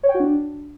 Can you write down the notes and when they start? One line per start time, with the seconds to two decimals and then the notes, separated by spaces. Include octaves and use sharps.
0.03 C#5
0.09 G5
0.14 F#4
0.20 D4